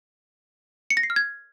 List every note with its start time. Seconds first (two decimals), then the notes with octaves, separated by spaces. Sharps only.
0.90 C#7
0.97 A#6
1.03 C7
1.10 F6
1.16 G#6